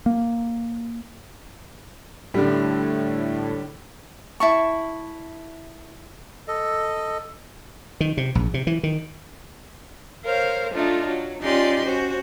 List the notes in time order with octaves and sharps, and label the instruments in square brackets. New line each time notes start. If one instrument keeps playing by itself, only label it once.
[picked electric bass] A#3
[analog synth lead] A2 [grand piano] D3 G3
[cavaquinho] E4 A5 C#6
[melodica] A4 D#5
[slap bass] D#3
C3
A#1
C3
E3
D#3
[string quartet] A#4 C5 C#5 F5
A3 D4 D#4 F4
F#3
C#4 D#4 F4 G4 D5 C6
C#4 F#4 C5